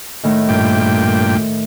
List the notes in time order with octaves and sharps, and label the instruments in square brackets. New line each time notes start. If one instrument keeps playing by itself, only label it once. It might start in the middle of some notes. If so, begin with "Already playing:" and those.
[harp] A2 D#3
[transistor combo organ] G2 A#2 G5